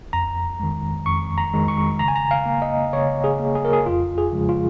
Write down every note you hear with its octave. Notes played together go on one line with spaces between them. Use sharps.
F2 A#5
D#3 G#3
F2 C#6
A#5
D#3 G#3
C#6
C#3 A#5
G#5
A#5
F5
A#3
D#5
C#3 C#5
G#4
A#3
G#4
A#4
G#4
F2 F4
G#4
C#3 F3 G#3
F4